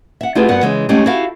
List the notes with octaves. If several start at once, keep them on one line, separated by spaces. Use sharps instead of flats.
E5 F#5
A3 E4 F4 G4 G#4 B4
G2 B3 F#4 A#4 F#5
C#3 E3 G#3
G#3 A3 C#4 D#4 G4
E4 F#4 G4 A4 E5 F5